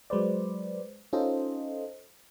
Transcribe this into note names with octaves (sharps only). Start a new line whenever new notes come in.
F#3 G#3 B4 C5 D5
C#4 D#4 F4 A4 C5 D#5